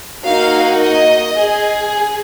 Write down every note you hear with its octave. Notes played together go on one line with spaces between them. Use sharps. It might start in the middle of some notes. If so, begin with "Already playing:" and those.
A#3 D#4 F#4 F5
D#5
G#4